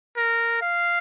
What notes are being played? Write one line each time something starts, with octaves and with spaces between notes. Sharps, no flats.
A#4
F5